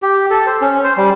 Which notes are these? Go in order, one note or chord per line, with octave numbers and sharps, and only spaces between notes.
G4
A4
C5
C#4
C5
G3